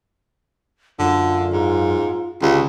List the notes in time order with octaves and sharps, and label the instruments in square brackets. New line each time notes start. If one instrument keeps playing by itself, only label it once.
[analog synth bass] F#2 [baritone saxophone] D3 [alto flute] F4
[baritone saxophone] G#2
[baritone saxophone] C#2 [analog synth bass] D3 [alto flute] G4